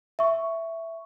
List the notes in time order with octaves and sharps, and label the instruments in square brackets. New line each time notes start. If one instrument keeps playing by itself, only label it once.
[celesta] E5 C#6